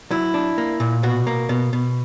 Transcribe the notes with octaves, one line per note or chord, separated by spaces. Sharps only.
F#3 E4
D4
A#3
A#2
B2 F#4
A#3
B2
B2